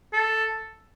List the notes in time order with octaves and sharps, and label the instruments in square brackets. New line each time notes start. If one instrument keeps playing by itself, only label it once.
[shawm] A4